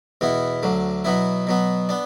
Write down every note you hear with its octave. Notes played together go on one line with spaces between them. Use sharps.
E2 B2 B3 E4
D2 D3 F#3
B2 F#3 B3 E4
B2 F#3 B3
B3 D4